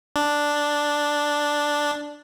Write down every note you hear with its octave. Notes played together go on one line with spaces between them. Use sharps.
D4